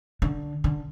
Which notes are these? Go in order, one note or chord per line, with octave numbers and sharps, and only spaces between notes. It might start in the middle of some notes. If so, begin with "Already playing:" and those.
D3
D3